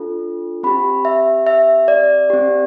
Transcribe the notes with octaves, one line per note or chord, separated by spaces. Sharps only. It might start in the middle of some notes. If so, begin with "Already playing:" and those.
Already playing: D4 F4 A4
C4 G4 B5
E5
E5
D5
C4 G4